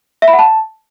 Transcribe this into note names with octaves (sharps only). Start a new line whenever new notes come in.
E5
B5
F#5
A5